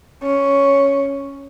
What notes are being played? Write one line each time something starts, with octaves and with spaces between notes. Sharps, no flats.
C#4